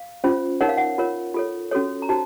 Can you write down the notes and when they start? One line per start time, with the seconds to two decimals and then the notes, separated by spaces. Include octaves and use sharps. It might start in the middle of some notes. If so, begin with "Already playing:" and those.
Already playing: F5
0.24 C#4 F4 C5
0.61 D#4 A#4 C#5 F#5
0.69 F5
0.78 F#5
0.98 F4 A#4 C#5
1.34 F4 A4 C#5
1.71 C#4 F#4 A4 C#5
2.02 A#5
2.09 D#4 F#4 C5 A5